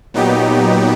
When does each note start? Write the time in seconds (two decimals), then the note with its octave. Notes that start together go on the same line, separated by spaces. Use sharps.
0.14 A#2 F#3 B3 D#4 G4